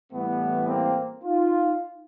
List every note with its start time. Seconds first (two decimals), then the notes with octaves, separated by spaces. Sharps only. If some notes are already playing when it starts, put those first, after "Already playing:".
0.12 A2 E3 G3 A3 B3
0.68 A#3 C4
1.24 D#4 F4